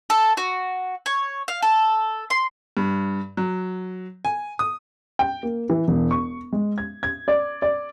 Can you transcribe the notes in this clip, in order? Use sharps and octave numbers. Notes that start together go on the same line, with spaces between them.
A4
F#4
C#5
F5
A4
C6
G2
F#3
G#5
D#6
G5
A#3
E3
E1
C#6
G#3
G#6
G#6
D5
D5